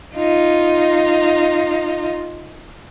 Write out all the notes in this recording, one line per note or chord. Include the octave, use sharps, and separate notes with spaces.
D#4 F4